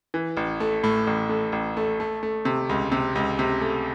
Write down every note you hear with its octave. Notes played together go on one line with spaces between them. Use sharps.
E3
A1
A3
A2
A1
A3
A1
A3
A3
A3
C3
C#2
C3
C#2
C3
A3